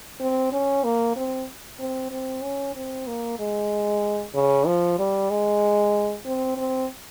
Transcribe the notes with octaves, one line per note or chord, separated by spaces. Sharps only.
C4
C#4
A#3
C4
C4
C4
C#4
C4
A#3
G#3
C#3
F3
G3
G#3
C4
C4